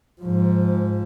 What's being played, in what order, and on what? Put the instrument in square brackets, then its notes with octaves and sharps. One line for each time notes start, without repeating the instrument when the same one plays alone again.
[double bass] G#2 F3